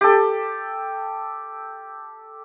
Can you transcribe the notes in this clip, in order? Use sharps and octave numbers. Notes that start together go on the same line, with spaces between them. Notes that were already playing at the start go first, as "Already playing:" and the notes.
G4 A4